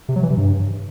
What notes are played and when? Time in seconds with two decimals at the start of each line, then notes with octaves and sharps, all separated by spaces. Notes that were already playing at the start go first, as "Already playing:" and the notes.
0.09 C3
0.16 F#3
0.23 E3
0.30 C3
0.37 G2